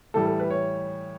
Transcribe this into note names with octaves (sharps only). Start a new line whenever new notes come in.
A2 E3 G3 A4
A4
B4
C#5